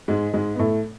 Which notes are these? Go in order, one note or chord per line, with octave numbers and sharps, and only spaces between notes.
G#2 G#3
G#2 G#3
B3
A2 A3